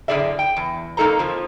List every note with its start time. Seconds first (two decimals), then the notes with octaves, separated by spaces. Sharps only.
0.08 F#2 A2 D3 G#4 D5 E5
0.39 G5
0.57 E2
0.97 F2 A#3 D#4 A4 C5 A#5
1.19 F2 F3